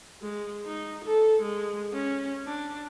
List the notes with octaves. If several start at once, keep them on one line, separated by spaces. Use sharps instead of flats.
G#3
D#4
A4
G#3
C#4
D4